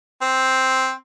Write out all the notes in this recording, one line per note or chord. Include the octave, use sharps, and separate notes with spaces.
C4